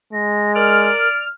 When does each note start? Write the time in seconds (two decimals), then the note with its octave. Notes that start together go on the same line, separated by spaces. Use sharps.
0.13 G#3 A#6
0.55 A#4 D5 F6